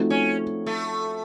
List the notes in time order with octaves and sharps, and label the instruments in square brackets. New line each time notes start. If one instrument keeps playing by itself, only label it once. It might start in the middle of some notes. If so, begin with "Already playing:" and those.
Already playing: [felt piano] F3 A3 C4 D#4 F#4
[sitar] C#4
A3